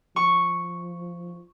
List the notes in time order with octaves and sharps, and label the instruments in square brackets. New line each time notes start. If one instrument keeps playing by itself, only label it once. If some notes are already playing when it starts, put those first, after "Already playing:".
[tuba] F3 [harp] C#6